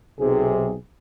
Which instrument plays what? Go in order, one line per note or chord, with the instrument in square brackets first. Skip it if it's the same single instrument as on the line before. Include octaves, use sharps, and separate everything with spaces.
[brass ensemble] B1 C3 G#4